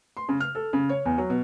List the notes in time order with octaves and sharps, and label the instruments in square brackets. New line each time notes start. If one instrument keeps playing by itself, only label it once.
[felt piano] C6
C#3
F6
A4
C#3
C#5
E2
F#3
B2